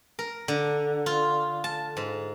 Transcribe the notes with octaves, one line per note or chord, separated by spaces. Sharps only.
A#4
D3
F4
A5
G#2